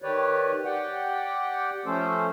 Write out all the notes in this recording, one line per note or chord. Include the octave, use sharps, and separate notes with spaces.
D#3 G4 B4 C#5 D5
G4 D5 F#5 G5
F3 A3 C#4 A4 C5